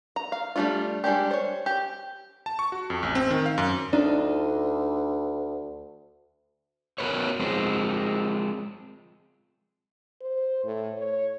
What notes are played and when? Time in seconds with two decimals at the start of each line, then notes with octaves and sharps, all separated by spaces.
0.16 A#5
0.32 F5
0.56 G3 A3 C#4 D4 F4
1.04 G3 G#3 D4 G4
1.31 C5 C#5
1.66 G4
2.46 A5
2.59 C#6
2.72 F#4
2.90 F2
3.03 A1
3.15 C4
3.31 D#3
3.46 F5
3.58 F#2
3.93 D2 D4 D#4 F4
6.98 B3 F#4 A#4 B4 C#5
7.40 F3 G#3 C4
10.21 C5
10.64 A2
10.98 C#5